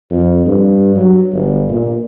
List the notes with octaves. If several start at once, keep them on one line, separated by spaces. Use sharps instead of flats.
F2
G2
F#3
G1
A#2